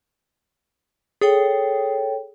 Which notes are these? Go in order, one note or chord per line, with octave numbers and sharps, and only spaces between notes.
G#4 A4 C#5 G5